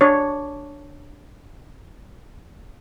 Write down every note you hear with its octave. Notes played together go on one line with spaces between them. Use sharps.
D4 C#5